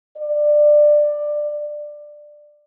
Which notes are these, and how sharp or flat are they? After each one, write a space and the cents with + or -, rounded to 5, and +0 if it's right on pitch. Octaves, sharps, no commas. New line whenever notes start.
D5 +15